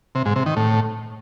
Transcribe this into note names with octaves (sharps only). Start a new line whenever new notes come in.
C3
G#2
C3
D#3
A2